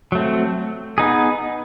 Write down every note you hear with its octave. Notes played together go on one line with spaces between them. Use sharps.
F#3 A3 C4
B3 D#4 G#4